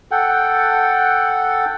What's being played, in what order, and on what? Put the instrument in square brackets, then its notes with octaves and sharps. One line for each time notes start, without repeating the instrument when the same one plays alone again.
[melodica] A4 F#5 G5